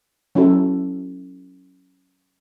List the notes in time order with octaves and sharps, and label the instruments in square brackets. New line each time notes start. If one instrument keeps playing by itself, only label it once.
[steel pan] F#3 C#4 E4 F#4 A4